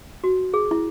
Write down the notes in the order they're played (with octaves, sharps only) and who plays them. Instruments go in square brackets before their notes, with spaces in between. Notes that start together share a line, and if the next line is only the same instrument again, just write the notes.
[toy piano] F#4
G#4
E4